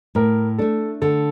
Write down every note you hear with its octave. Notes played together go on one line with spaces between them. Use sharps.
A2 A#4
A3 D4 A4
D3 A4